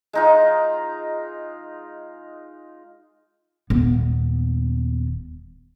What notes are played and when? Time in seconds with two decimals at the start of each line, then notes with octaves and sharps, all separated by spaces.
0.13 G#3 D#4 F4
3.70 D#1 B3